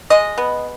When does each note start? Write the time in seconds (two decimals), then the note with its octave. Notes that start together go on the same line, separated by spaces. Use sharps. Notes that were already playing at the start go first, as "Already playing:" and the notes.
0.10 G#3 D#5
0.38 B3